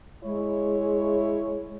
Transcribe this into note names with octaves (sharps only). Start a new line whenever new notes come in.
G#3 E4 C#5